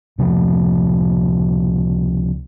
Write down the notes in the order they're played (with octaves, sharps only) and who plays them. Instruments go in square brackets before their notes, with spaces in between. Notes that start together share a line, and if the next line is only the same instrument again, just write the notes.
[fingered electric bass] C#2 C3 E3 F3